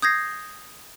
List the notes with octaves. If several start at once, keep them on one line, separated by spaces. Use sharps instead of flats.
D#6 G6 G#6 A#6 C7